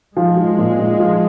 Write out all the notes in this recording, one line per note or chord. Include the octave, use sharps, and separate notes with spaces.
F3 G#3
F3
A#2
A#2
F3